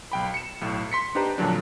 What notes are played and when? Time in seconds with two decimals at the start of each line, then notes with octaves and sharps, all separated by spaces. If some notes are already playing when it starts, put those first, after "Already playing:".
0.12 B1 G5 B5
0.34 C#7 E7
0.61 B1 A2
0.92 C6 B6 C#7
1.15 D4 D#4 G4 B4 C5 A#5
1.38 F2 A#2 D3 F#3 D4